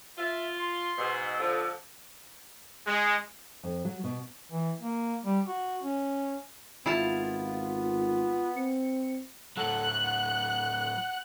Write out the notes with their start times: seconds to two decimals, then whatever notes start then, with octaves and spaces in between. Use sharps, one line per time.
0.18 F4 E5
0.59 C6
0.98 G#2 B2 E6
1.40 D3 F3 A4
2.87 G#3
3.63 F2
3.85 F#3
4.04 B2
4.52 E3
4.80 A#3
5.25 G3
5.47 F#4
5.83 C#4
6.86 G#1 B3 E4 F4 F5 A5
8.56 C4 C#7
9.57 A2 F#3 A4 F#5 F#6
10.03 F#5